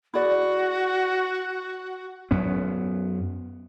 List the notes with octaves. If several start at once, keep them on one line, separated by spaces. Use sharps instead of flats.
E4 F#4 G#4 D5
F#2 B3 C#4